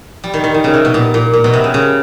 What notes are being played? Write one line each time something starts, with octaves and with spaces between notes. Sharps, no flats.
G3
D#3
D#3
D#3
C#3
C3
B2
A#2
A#2
A#2
B2
C3
C#3
C#3